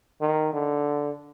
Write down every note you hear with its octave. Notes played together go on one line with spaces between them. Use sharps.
D#3
D3